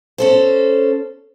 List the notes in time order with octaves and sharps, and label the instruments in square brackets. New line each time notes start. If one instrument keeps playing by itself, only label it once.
[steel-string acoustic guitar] C#4 A4 C5